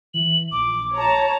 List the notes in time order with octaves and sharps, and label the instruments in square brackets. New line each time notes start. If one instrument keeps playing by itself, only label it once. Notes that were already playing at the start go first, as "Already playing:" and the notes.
[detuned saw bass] E3 [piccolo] F#7
[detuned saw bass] A#1 [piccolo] D6
[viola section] C#5 A#5 [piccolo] A5